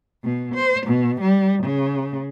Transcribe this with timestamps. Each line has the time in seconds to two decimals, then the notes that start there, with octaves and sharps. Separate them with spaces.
0.24 B2
0.55 C5
0.86 B2
1.21 G3
1.64 C#3